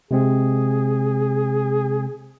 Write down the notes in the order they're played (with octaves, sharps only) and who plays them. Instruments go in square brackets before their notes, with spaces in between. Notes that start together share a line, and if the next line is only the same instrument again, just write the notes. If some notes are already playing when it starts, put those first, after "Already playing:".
[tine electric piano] C3 G#3 C4 [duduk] G#4